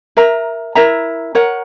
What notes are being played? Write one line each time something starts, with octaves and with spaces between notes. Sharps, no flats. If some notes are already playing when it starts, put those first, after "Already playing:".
A#4 E5 A#5
E4 A#4 E5 A#5
A#4 C#5 F#5